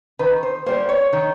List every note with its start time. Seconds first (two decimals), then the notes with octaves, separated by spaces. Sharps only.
0.19 D#3 B4
0.43 C5
0.66 G3 A#3 C5
0.89 C#5
1.13 D#3